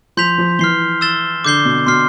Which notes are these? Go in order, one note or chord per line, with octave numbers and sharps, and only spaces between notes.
F3 C6 G6 B6 F7
F3
E3 F6 C7 G7
E6 A6 E7 G7
D3 D6 G6 C7 G7
B2
B2 C6 F6 C7